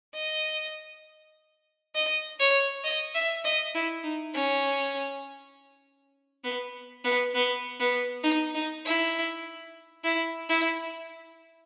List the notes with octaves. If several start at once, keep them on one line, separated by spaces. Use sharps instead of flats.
D#5
D#5
C#5
D#5
E5
D#5
E4
D#4
C#4
B3
B3
B3
B3
D#4
D#4
E4
E4
E4